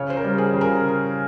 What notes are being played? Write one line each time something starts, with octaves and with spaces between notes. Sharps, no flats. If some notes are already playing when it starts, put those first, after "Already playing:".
Already playing: C#3 C#5
C5
A#4
G3
G#4
C#3
A#4